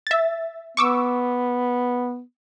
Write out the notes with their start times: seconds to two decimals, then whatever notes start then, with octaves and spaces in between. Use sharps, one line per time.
0.07 E5 A6
0.77 B3 C#6 D6 E6